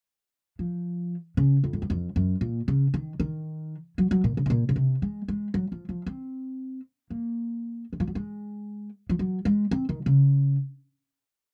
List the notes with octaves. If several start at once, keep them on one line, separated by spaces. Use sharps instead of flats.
F3
C#3
F2
G#2
F#2
F2
F#2
A#2
C#3
D#3
D#3
F#3
F#3
A#2
C#3
C3
A#2
C#3
C3
G#3
G#3
F#3
F3
F3
C4
A#3
D#3
F3
F#3
G#3
F3
F#3
G#3
C4
D#3
C#3